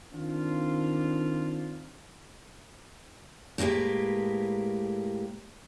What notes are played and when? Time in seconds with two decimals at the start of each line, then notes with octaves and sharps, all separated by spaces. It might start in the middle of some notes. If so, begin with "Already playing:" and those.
0.13 D#3 C4 D4 F4
3.58 A2 G#3 A#3 G4 B4